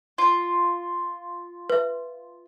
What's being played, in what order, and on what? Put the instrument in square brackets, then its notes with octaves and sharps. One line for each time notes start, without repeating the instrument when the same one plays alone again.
[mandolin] F4
[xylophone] B4 E5